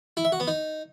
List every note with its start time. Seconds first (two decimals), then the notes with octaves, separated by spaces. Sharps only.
0.17 E4
0.25 E5
0.32 F#4
0.40 B3
0.47 D#4